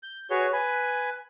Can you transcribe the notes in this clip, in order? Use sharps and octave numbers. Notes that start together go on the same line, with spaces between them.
G6
F#4 G#4 B4 C#5
B4 G#5 B5